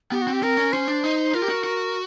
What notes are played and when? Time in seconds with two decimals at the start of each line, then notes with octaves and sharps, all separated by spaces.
0.11 B3 G4
0.22 F#4
0.27 C4
0.33 G4
0.42 C4 A#4
0.57 C#4
0.72 C#4 C5
0.88 D4
1.04 D#4
1.34 F4 A#4
1.42 G4
1.49 F#4
1.64 F#4